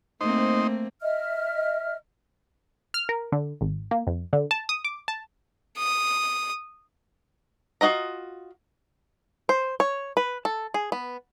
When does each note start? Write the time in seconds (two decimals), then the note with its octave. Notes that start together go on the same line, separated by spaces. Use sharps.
0.21 A3 A#3 C4 D#4 C5
1.02 D#5 E5 F6
2.94 F6
3.09 A#4
3.32 D3
3.61 G#1
3.91 A#3
4.07 F2
4.33 D3
4.51 A5
4.69 D#6
4.84 D6
5.08 A5
5.78 D#6
7.81 F4 F#4 D#5 A#5
9.49 C5
9.80 C#5
10.17 B4
10.45 A4
10.74 G#4
10.92 B3